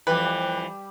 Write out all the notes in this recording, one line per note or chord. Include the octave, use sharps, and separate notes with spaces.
F2 E3 G3 G4 B4